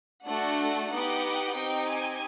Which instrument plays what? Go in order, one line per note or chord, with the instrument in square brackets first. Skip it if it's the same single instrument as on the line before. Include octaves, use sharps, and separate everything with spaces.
[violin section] A3 D4 F#4 A4 F#5
B3 D#4 G4 F#5
C4 D#4 G4 G5
G#5